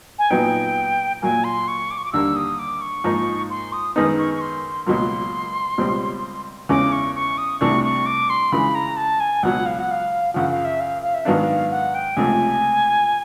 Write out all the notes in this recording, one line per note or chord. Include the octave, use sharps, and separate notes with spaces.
G#5
A#2 F#3 B3 D#4 G5
A#2 F#3 A#3 G#5
C6
C#6
D6
C#6
D6
D#2 D3 G3 A#3 E6
D#6
D6
C#6
G#2 F3 A#3 D#4
C6
D#6
F#2 D#3 G#3 B3 D#4 D#6
C#6
C#6
C6
C#2 B2 F#3 A#3 C6
C#2 B2 G3 C4
E2 C#3 E3 G#3 C#4 D6
C#6
C#6
D#6
C2 C3 E3 A3 D4 C#6
C#6
D6
C6
C#3 E3 G#3 B5
A#5
A5
G#5
C#2 B2 F#3 F#5
F5
F#5
F5
F#2 C#3 F3 F#5
F5
E5
F5
F5
E5
G#2 D#3 F#3 B3 D4 F5
F#5
G5
C#2 C3 F3 A3 G#5